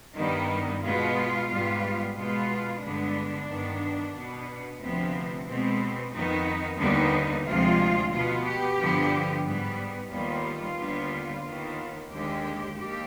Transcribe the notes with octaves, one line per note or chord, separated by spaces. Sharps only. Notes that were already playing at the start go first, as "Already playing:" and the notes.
G2 D#3 G3 B3 D#4
B2 G#3 B3 F4
G#2 G3 B3
B2 G#3 B3 F4
G2 D3 G#3 B3 D4
G2 D#3 B3
B2 B3
D2 C3 F3 B3 C4
B2 G#3 B3 C4
F2 D#3 B3 D#4
D#2 D3 G3 B3 D#4
D2 C3 F3 G#3 F4
B2 B3 F4
G4
G2 D3 F3 B3
G#2 G3 B3
D#2 D#3 G3 B3 F4
D#2 D3 G3 B3
D#2 D#3 B3
D#2 D3 G#3 G4
D#2 G4